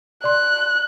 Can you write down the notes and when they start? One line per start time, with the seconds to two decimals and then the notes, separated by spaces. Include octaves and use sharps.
0.24 D5 C6 F#6